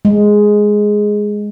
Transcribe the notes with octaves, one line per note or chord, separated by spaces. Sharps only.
G#3